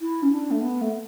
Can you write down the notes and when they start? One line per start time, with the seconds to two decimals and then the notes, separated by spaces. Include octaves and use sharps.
0.01 E4
0.23 C#4
0.32 D4
0.51 A3
0.61 B3
0.81 A3